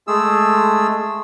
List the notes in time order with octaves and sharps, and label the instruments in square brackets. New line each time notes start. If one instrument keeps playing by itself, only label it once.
[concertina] G#3 A3 G#4 E6